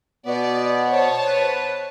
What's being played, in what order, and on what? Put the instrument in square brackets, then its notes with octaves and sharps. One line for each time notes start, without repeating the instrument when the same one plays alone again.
[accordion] B2 B3 [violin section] D5
[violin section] C5 C#5 A5
[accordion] B4